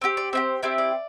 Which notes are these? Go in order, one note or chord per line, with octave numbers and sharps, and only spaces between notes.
C4 E4 G4
D5
C4 E4 G4 C5
C4 E4 G4 D5
D5